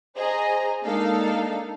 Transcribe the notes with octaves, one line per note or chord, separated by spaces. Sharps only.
G#4 C5 D#5 A#5
G#3 A#3 D4 D#4 A4 F5